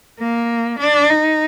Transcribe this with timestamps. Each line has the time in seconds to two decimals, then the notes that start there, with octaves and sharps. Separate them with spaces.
0.19 A#3
0.80 D4
1.10 D#4